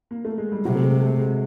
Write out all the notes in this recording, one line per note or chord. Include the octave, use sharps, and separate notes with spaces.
A#3
A3
G#3
G3
C3 F#3
A3
G#3
A3
G#3